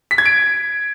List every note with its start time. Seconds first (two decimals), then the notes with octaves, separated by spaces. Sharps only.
0.11 B6
0.18 G#6
0.26 D7